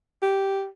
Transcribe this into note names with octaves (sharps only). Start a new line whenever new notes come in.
G4